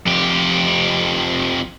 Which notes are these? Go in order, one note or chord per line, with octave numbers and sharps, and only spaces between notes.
F2 G4